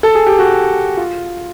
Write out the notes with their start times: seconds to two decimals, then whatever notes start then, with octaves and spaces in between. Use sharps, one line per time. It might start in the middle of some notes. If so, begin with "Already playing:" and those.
0.03 A4
0.15 G#4
0.27 G4
0.39 F#4
0.97 F4